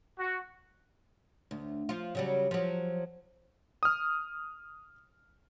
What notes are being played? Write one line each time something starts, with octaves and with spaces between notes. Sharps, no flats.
F#4
D2
F3 F4
C#3 F#3 G3
F3 F#3
D#6 F6